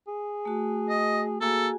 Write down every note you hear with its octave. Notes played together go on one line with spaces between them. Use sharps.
G#4
A3 F#4
D#5
A#3 F#4 G#4 A4 G#5